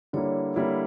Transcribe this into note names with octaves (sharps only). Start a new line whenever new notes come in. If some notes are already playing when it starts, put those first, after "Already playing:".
D3 G3 A#3 E4 C#5
D3 G3 A#3 E4